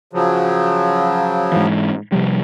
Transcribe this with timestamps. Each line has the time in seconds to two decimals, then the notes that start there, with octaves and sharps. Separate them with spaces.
0.13 C#3 F3 F#3
1.52 G#2 E3
2.12 C3 F3 G3